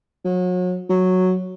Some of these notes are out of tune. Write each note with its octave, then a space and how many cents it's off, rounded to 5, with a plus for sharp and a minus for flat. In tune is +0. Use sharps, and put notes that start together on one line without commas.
F#3 -35
F#3 -5